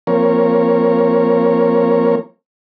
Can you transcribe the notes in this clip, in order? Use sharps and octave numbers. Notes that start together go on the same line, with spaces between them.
F3 A#3 C4 A#4 C#5